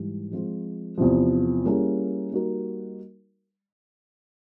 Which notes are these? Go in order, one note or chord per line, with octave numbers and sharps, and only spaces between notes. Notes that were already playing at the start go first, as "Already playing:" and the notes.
Already playing: G#2 E3 G3
F3 G#3 C4 F4
E2 C3 F3
G3 A#3 C#4 E4 G#4
G3 A#3 D#4 F#4 A#4